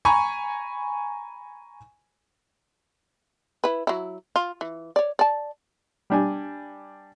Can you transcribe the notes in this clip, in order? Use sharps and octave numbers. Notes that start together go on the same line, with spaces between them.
G#5 A#5 B5 C#6
E4 B4
F#3 E4
F4
E3
C#5 D5
D5 A5
G3 D4 G#5